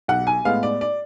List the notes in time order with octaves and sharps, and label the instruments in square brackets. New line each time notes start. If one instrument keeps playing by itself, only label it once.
[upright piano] B1 F#5
G#5
A2 G#3 B3 F5
D5
D5